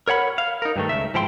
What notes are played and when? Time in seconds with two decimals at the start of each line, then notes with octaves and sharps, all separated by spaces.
0.08 A#4 C#5 F#5 B5
0.38 F5
0.62 D#4 A#4
0.76 G2 D#3 A3
0.89 C#2 E5
1.14 G#2 F3 E4 G5 C6